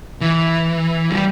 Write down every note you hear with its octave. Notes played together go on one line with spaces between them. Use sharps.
E3
G3